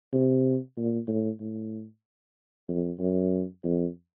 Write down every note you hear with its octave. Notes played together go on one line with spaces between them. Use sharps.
C3
A#2
A2
A2
F2
F#2
F2